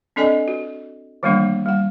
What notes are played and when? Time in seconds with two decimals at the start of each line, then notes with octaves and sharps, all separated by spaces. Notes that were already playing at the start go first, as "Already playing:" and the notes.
0.16 C4 D4 A4 D5 D#5 G#5
0.48 F#4
1.23 D#3 E3 G3 A3 A#3 D4
1.66 G3 F#5